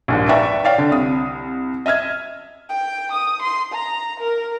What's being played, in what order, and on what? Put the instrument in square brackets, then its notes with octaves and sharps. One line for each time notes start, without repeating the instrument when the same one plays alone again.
[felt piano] A#1 D#2 G#2
B4 D5 E5 G5 A#5 C#6
C#5 D5 F5 G5
D3
C2 D#6
D#5 E5 F6 G#6
[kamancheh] G5
D#6
C6
A#5
A#4